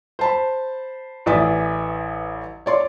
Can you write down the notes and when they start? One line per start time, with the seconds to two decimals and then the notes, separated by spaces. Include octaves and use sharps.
0.19 C5 A5 B5
1.26 A1 E3 D5 E5 D#6 A6
2.66 C#5 D5 C6